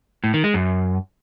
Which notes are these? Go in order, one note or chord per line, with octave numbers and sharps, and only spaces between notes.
A2
D#3
G#3
F#2